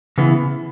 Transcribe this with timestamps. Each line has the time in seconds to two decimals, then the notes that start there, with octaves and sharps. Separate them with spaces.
0.18 C#3 E3 B3 E4